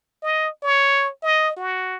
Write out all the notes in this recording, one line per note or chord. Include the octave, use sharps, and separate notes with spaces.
D#5
C#5
D#5
F#4